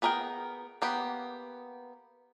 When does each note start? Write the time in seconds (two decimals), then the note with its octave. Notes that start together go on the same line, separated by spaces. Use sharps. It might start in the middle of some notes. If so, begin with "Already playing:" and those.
0.02 B3 G#4 A#4 D5 G5
0.82 A#3 B3 G4